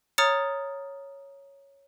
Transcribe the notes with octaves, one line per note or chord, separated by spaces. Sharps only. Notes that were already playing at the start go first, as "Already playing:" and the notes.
C#5 A#5 D#6 F6 A6 C#7